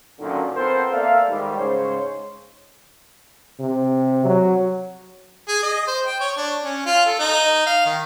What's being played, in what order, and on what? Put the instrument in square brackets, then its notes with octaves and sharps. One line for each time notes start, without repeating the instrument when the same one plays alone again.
[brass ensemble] F#2 A#2 D3 D#3
B3 C4 F4 A4 A#4 C5
A#3 A4 D5 E5 F5
G#2 D#3 G3
G#2 C#3 C5 C#5
[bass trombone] C3
F#3
[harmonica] G#4
D#5
C5
G5
C#5
D4
C#4
F4
A4
D#4
F5
D#3